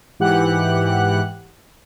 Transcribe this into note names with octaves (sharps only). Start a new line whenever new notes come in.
G#2 E3 G4 F#5 F#6